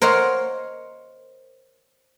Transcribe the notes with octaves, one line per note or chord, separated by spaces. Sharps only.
A#4 C5 C#5 D#5 F5 F#5